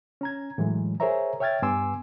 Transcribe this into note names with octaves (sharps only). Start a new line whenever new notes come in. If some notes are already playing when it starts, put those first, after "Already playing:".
C#4 A#5 G#6
A2 E3 F#3 G#3
G#4 A#4 C5 C#5 E5 A#5
C#5 E5 G5 F6 G#6 A6
G2 B3 G#5 C6 D6 E6